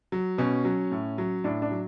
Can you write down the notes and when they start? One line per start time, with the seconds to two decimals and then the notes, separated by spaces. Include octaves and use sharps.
0.12 F#3
0.38 B2 C#4
0.65 F#3
0.92 A2
1.18 F#3
1.44 A2 D4
1.62 D4
1.71 F#3